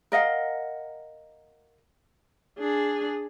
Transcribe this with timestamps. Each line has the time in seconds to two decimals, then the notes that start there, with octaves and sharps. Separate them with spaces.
0.12 A#4 D#5 F5 F#5
2.59 D4 G#4